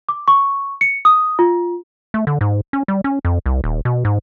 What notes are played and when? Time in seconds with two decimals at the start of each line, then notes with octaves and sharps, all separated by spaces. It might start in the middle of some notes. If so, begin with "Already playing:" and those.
0.09 D6
0.28 C#6
0.81 C#7
1.05 D#6
1.39 F4
2.14 A3
2.27 D3
2.41 G#2
2.73 C#4
2.88 G3
3.04 C#4
3.25 F2
3.46 C2
3.64 D#1
3.85 B2
4.05 G#2